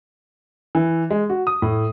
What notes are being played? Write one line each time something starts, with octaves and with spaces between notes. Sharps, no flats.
E3
G#3
F#4
D#6
A2